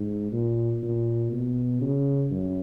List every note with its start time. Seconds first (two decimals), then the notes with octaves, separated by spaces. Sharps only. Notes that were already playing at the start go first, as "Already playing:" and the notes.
Already playing: G#2
0.32 A#2
0.83 A#2
1.32 B2
1.81 C#3
2.31 F#2